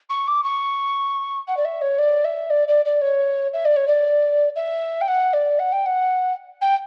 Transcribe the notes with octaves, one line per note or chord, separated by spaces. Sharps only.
C#6
D6
C#6
F#5
D5
E5
C#5
D5
E5
D5
D5
D5
C#5
E5
D5
C#5
D5
E5
G5
F#5
D5
F#5
G5
F#5
G5